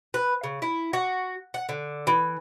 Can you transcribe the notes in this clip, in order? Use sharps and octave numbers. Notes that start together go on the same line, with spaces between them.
B4
C#3
E4
F#4
F#5
D3
E3